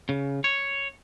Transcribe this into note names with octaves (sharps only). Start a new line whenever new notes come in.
C#3
C#5